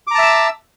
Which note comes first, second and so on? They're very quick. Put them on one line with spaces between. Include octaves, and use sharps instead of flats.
D6 A#5 A5 E5 E6